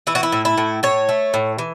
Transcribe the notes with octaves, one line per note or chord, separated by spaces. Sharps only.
E3 E4
F#4
E4
A2
E4
A2
A2 C#5
A3
A2
E3